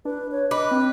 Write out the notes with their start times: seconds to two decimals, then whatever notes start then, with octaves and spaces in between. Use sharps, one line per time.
0.05 D4 B4
0.31 C#5
0.51 B4 D#5 D6
0.71 C4